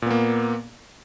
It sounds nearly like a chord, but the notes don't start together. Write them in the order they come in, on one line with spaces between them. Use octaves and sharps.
A#2 B3 A#3